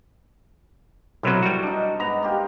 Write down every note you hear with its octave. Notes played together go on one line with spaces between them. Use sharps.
B1 C3 F#3 E4 A#4 C5
G3 F#4
D4 D#4
G#2 B3 F#5 A#5
A#3 F4 G4